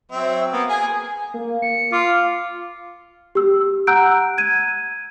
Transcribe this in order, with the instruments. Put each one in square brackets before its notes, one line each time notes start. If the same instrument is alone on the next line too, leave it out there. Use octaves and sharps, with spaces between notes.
[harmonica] F#3 C4 E5
A#3 B3
G#4 G#5
[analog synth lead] A#3
C#7
[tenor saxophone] F4 [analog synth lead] D6
[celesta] G4 E6
F#5 A#5 E6 F#6 G6 D7
G#6 D#7